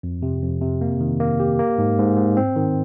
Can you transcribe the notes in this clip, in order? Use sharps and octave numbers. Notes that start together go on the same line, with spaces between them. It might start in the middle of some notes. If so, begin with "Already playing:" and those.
F2
C3
F2
C3
A#3
D#3
A#3
G4
A#3
G#2
G#2
G#2
C4
D#3